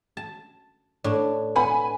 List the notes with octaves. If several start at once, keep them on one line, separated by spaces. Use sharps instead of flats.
A5
A2 D4
B4 F#5 G#5 B5